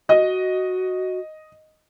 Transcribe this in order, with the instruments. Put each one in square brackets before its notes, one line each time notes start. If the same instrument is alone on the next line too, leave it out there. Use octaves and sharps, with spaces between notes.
[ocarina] F#4 [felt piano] D#5